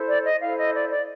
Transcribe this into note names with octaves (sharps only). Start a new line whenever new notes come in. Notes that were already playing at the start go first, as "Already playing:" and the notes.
Already playing: E4 A4 C5
D5
D#5
E4 A4 C5 F5
D#5
D5
D5